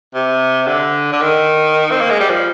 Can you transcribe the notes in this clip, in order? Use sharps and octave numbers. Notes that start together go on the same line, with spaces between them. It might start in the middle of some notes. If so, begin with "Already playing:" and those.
C3
D3
D3
D#3
C4
A#3
G#3
G3
F3